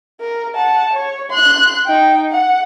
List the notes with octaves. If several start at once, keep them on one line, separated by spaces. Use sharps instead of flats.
A#4
F#5 A5
C#5
C6 F#6
D#4 G5
F#5